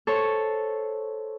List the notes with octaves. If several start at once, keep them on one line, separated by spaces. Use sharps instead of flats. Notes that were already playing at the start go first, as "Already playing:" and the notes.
A4 C5 C#5